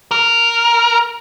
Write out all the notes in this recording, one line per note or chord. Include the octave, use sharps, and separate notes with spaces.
A#4